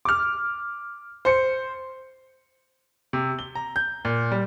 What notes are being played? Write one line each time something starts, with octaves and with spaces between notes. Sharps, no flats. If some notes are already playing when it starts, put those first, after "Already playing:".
D6 F6
C5 C#7
C3
G7
A#5
G6
A#2
G3